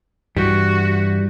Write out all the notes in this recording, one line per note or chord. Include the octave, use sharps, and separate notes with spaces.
G2 E3 G3 F#4